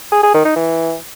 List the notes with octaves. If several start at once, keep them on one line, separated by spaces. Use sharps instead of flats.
G#4
G#4
D#3
D#4
E3